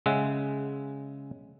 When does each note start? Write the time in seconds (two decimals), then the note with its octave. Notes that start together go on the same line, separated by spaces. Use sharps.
0.06 C#3 G#3 E5 F#5